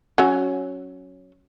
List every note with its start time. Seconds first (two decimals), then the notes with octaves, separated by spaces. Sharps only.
0.18 F#3 C#4 F#4